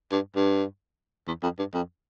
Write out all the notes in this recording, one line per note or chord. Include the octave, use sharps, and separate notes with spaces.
G2
G2
E2
F2
G2
F2